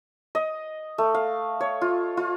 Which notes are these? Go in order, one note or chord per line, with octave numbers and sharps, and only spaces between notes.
D#5
A3
F5
C#5
F4
F4